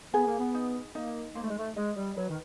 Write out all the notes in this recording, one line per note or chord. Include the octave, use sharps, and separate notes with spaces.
B3 G#4
A#3
B3
D#4
A#3 D#4
A#3 C5
A3
G#3
A3
G#3 D#5
G3
F#3 B4
D#3